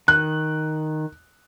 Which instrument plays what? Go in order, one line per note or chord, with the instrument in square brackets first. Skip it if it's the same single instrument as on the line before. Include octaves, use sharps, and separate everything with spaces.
[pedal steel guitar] D#3 [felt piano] F#6